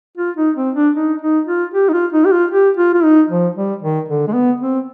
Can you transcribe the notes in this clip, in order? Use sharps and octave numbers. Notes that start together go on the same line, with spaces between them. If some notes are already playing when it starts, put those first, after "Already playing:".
F4
D#4
C4
D4
D#4
D#4
F4
G4
D#4
F4
D#4
G4
F4
G4
F4
F4
D#4
F3
G3
D#3
D3
G#3
B3
C4